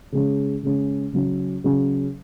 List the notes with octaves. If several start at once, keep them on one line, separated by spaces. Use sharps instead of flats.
C#3 G#3 C#4
C#3 G#3 C#4
C#3 F#3 C#4
C#3 F#3 C#4